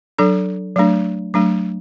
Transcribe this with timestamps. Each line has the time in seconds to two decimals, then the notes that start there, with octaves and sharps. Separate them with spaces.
0.18 F#3 D4 A4
0.76 F#3 A3 D4
1.34 F#3 A3 D4